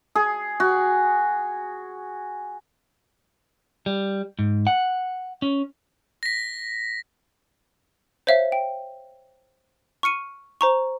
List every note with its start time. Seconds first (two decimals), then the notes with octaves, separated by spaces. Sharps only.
0.15 G#4
0.60 F#4
3.86 G3
4.39 G#2
4.67 F#5
5.42 C#4
6.23 A#6 B6
8.27 C5 C#5 E5 F5
8.52 G5
10.03 C#6 F6 C#7 D#7
10.61 C5 A#5 C#6